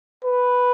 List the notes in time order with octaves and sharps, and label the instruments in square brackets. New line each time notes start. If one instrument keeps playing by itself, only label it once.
[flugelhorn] B4